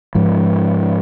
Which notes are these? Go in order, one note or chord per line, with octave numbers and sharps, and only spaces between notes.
G#2 F3